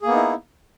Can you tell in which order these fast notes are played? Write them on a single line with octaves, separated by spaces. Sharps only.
G#4 A#3 B3 D#4 E4